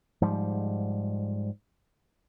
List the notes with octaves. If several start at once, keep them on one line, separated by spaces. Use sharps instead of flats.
G#2 F3 G3